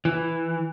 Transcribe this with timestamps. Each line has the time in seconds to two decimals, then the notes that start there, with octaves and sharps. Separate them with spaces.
0.05 E3